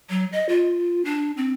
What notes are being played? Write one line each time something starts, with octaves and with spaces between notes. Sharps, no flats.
F#3
D#5
F4
D4
C4